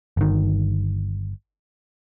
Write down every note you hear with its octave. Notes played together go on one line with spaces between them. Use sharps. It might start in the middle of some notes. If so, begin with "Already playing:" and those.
G1 D#3